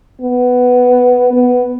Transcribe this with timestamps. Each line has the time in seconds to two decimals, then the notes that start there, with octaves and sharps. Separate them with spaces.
0.21 B3
1.33 B3